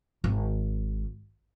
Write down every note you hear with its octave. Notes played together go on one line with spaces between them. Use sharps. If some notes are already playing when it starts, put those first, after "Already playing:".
G#1